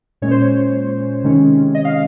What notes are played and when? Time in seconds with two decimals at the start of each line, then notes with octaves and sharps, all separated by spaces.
0.22 A#2 G#3 C#4 C#5
0.31 C5
0.41 C#5
1.24 C3 D#3 G#3 C#4
1.75 D#5
1.85 F5